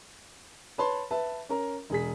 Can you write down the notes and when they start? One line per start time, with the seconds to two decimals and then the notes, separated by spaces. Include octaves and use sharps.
0.78 B4 C#5 A5 B5 C6
1.11 B4 E5 A5
1.49 C#4 A#4 A#5
1.90 E1 G#4 B6